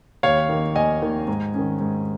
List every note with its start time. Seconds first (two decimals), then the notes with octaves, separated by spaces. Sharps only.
0.23 D#2 C#5 F5
0.49 D#3 A#3
0.75 D#2 D#5 G#5
1.02 D#3 A#3
1.28 G#2
1.54 D#3 C#4
1.81 G#2